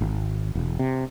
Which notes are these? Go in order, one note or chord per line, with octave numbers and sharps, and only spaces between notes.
G#1
E1
C3